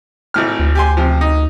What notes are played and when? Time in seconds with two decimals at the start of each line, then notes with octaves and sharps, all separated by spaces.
0.34 G#1 A2 F6
0.60 D2
0.75 G4 G#5 C6
0.97 C3 F3
1.21 D#4